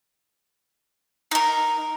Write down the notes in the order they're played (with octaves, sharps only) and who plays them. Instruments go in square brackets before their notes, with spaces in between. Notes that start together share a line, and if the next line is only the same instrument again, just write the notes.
[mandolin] D#4 A#4